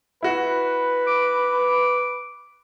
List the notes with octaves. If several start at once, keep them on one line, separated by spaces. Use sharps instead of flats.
E4 F#4 B4
D6